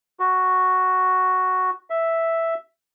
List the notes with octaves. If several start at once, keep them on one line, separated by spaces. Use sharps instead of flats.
F#4
E5